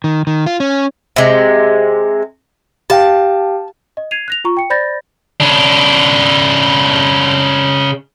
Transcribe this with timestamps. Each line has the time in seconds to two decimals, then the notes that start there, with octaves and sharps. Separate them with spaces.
0.04 D#3
0.27 D#3
0.46 F4
0.60 C#4
1.16 C3 G#3
2.90 G4 F5 G5 A5
3.97 D#5
4.11 G#6 C7 D#7 F7
4.28 F#6 A#6 F7
4.45 F4 A#5 C#6
4.57 G5 C#7
4.70 C5 D5 B5 G6 A6 A#6
5.40 C#3 D4